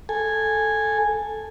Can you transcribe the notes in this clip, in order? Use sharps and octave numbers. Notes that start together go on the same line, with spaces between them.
A4 G#5